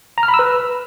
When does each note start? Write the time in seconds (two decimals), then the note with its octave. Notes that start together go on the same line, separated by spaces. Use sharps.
0.18 A#5
0.23 F6
0.28 B5
0.34 E6
0.39 B4